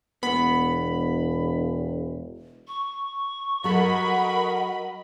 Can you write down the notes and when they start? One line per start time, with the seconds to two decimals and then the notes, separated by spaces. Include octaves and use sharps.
0.23 E1 B3 B5
2.68 C#6
3.64 F#3 A4 A#4 D#5 F#5 B5